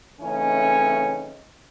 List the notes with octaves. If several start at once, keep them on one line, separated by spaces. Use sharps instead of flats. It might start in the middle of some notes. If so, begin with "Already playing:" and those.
C#3 E3 A3 C4 C#4 D#4